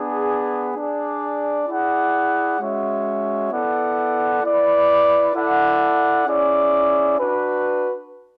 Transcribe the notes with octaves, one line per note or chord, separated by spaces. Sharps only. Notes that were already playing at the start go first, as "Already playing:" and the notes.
Already playing: B3 D4 G#4
D4 G#4 D5
E4 G#4 D5 F#5
G#3 C#4 F#4 C#5 E5
B3 E4 A4 D5 F#5
E4 B4 D5
E4 A4 D5 F#5
C#4 E4 G#4 D5
D4 F#4 B4